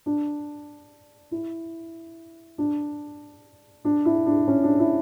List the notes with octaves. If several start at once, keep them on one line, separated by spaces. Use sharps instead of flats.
D4
E4
D4
D4
E4
D4
C#4
D4
E4